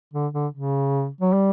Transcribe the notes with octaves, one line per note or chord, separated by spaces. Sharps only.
D3
D3
C#3
F#3
G3